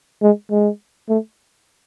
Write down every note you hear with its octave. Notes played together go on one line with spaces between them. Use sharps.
G#3
G#3
A3